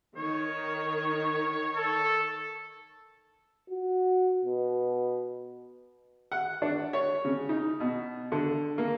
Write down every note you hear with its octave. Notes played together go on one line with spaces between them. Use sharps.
D#3 C#5
A4
F#4
B2
F#5
D4
C#5
C#3
D#4
B2
D3
A#3